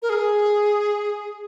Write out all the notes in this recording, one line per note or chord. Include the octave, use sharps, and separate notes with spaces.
A#4
G#4